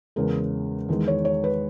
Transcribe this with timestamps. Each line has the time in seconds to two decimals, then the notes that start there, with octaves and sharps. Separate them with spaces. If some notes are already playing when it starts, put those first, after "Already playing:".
0.16 E2 C#3 G#3 A#4
0.89 E2 D#3 G#3
1.08 C#5
1.25 C#5
1.44 B4